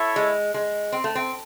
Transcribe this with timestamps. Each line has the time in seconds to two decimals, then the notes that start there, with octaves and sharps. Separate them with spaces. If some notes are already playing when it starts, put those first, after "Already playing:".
Already playing: E4 A4 C#5 E5
0.16 G#3
0.54 G#3
0.92 C4
1.04 A3
1.15 C4